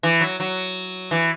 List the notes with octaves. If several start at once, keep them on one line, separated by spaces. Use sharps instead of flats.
E3
F#3
F#3
E3